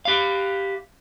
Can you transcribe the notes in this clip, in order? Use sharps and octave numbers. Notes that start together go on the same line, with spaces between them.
G4 F5